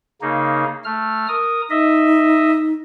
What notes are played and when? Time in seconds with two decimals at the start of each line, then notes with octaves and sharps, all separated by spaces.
0.22 C#3 A#3 D#4
0.84 A3 F6
1.28 A#4 D#6
1.70 D#4 D#5 E5